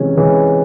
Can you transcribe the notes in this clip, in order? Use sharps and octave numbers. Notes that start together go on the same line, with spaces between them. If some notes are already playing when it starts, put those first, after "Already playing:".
Already playing: C3 E3 G#3 C#4
E3 G#3 C#4